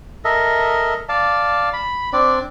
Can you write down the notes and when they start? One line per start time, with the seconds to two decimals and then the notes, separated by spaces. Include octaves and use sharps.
0.25 A4 A#4 D#5 E5
1.09 D5 F5 A5
1.73 B5
2.13 C4 D4 D5